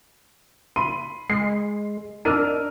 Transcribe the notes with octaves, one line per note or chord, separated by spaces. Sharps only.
B5 C6 D#7
G#3 C7
D4 D#4 A#4 E6 F6 D#7